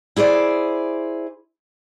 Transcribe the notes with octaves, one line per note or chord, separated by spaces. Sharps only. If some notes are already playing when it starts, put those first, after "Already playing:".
E4 G#4 C5 D5